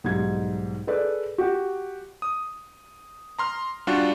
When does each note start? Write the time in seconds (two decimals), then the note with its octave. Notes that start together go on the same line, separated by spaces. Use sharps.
0.04 B1 G#2 G3 G#6
0.87 G#4 A4 B4 D5
1.38 F#4 G4
2.22 D#6
3.39 A#5 C6 F6
3.87 G3 D4 F4 F#4